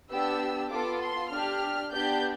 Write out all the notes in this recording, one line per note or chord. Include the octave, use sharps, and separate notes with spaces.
B3 D4 G4 E6
B3 F4 A4 D6
C6
D4 G4 F6
B3 D4 G4 G6